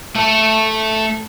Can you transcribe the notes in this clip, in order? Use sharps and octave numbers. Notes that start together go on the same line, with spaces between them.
A3 A4